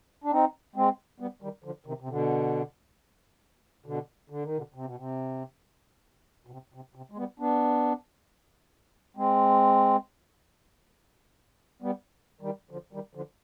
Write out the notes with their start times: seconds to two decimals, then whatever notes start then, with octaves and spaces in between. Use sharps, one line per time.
0.24 D4
0.32 C4 D#4
0.76 G#3 C4
1.20 G3 B3
1.42 D#3 G3
1.64 D3 F3
1.86 C3 D#3
2.00 C3
2.09 B2 D3
3.86 B2 D3
4.30 D3
4.43 D#3
4.57 B2 D3
4.74 C3
4.85 B2
4.97 C3
6.47 B2
6.51 C3
6.74 C3
6.95 C3
7.11 G#3
7.18 G3 B3
7.40 B3 D4
9.17 G#3 C4
11.82 G3 B3
12.41 D#3 G3
12.71 D3 F3
12.93 D#3 G3
13.15 D3 F3